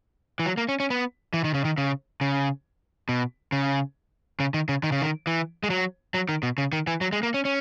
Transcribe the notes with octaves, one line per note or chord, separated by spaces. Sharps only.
E3
F#3
A#3
C#4
C#4
B3
E3
D#3
C#3
D#3
C#3
C#3
B2
C#3
C#3
D#3
C#3
D#3
C#3
D#3
E3
G#3
F#3
F#3
D#3
B2
C#3
D#3
E3
F#3
G#3
A#3
C#4
C#4